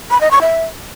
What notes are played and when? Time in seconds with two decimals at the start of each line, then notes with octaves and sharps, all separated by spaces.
0.10 B5
0.21 D#5
0.31 C#6
0.41 E5